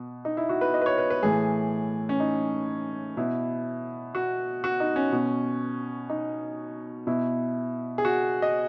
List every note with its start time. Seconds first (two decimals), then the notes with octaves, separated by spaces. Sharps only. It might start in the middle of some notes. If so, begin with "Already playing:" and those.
Already playing: B2
0.25 D#4
0.37 E4
0.49 F#4
0.61 B4
0.74 D#5
0.82 B4
0.86 C#5
0.98 B4
1.10 B4
1.23 A2 E3 G#4
2.09 C#4
2.20 D#4
3.17 B2 E4
4.15 F#4
4.64 F#4
4.80 D#4
4.96 C#4
5.12 B2
6.10 D#4
7.07 B2 E4
7.98 G#4
8.05 F#4
8.42 D#5